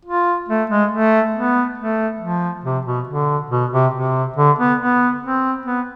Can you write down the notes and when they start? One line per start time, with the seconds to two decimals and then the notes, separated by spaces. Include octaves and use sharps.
0.05 F4
0.48 A3
0.70 G#3
0.91 A3
1.34 B3
1.78 A3
2.20 F3
2.64 C3
2.85 B2
3.07 D3
3.50 B2
3.72 C3
3.93 C3
4.36 D3
4.58 B3
4.80 B3
5.23 C4
5.66 B3